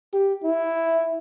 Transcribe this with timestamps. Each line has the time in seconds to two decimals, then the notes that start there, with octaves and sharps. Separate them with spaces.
0.13 G4
0.44 E4